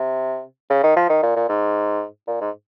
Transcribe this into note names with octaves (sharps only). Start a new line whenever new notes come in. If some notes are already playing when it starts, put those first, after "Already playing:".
Already playing: C3
C#3
D#3
F3
D#3
A#2
A#2
G#2
A#2
G#2